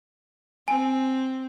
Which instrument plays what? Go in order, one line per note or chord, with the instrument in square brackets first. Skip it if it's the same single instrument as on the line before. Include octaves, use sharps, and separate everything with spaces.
[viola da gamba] C4 [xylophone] G#5